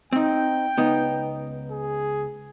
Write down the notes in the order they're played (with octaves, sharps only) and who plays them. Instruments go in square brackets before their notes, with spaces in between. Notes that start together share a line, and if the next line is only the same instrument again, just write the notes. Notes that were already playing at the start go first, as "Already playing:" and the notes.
[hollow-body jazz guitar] C4 D#4 [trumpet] G5
[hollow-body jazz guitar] C#2 B3 D#4
[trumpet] G#4